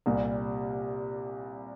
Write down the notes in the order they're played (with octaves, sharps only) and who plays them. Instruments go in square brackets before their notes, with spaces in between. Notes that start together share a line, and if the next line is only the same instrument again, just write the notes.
[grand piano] C2 A#2 G3